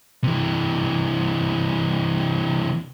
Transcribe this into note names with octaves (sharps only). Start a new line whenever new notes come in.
C3 E3